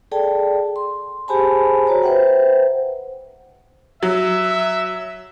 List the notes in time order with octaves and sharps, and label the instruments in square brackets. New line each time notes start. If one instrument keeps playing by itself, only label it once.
[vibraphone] G#4 A4 D5 G5 A5
C6
G4 G#4 C5 G#5 A5 B5
F#4 C5 C#5 A#5
B4 C5 E5 F#5 G5
[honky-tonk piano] F#3 [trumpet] E5